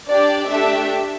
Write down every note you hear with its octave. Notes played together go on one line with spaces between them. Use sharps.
D4 G4 D5
A3 D4 G4 E5